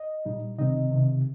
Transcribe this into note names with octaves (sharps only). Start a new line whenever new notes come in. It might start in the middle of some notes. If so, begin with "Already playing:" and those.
Already playing: D#5
A#2 G3 D#4
C3 D#3 C4 D#4 D#5
C3 D#3 C4